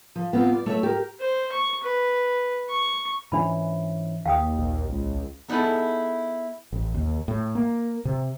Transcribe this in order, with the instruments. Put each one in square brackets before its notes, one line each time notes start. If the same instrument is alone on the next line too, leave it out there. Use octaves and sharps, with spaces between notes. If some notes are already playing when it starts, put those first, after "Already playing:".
[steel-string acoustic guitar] F3
B3 C4 F4
D5
A3 C#5 E5
G4 A#4
[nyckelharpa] C5
C#6
B4
C#6
[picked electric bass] G#2 E3 C#4 [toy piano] D4 B5
[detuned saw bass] D#2 [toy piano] F5 G5 D#6
[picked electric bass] A#1
[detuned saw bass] C#2
[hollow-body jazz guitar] B3 D#4 E4 G#4 A4
[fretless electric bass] A1
D#2
A2
A#3
C3